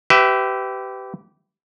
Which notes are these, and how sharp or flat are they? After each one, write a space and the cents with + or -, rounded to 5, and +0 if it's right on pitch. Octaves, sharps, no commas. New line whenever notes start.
G4 -20 B4 +25 E5 +0